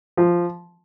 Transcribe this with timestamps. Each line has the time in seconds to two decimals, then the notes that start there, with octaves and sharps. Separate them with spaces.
0.17 F3